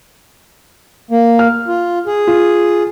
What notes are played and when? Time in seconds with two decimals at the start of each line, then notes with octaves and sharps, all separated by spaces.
1.11 A#3
1.39 F6
1.68 F4
2.07 G#4
2.27 F4